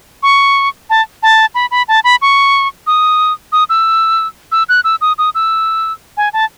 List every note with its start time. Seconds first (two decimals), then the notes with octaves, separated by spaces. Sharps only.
0.23 C#6
0.90 A5
1.23 A5
1.55 B5
1.71 B5
1.88 A5
2.04 B5
2.22 C#6
2.87 D#6
3.52 D#6
3.69 E6
4.52 E6
4.69 F#6
4.84 E6
5.01 D#6
5.18 D#6
5.35 E6
6.17 G#5
6.33 A5